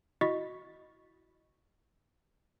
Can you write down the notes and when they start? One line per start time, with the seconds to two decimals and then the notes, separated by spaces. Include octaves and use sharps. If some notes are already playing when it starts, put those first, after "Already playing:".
0.21 E4 F#4 D#5 C#6 A6 B6